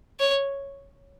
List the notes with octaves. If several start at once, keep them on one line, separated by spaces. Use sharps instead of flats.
C#5